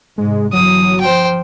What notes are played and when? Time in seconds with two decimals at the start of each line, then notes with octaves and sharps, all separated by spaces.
0.18 G#2 C3 G#3
0.53 G1 E3 F#3 D#6
1.01 F3 C5 G5